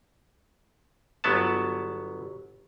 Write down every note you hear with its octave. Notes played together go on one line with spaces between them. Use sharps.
G1 F#3 B3 A5